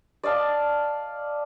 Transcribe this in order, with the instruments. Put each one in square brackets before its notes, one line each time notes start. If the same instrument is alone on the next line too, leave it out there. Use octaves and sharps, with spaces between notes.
[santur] D5 D#5 F5 A5